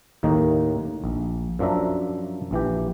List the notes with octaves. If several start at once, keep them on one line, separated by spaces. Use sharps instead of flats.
D#2 A2 D#3 A#3 D#4
A#1
F#2 F3 F#3 D4 E5 A#5
A#1 E3 G4